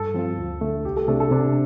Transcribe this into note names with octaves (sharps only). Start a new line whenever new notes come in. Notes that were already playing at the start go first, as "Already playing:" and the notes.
Already playing: G2 A4
F3 C4 F4
D2
D3 A3
C2 G4
A4
C3 A3 D4 A4
A4
C3 D4